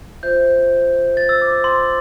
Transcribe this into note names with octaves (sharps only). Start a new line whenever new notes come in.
F4 C5 E5 G6
A6
E6
D6
C6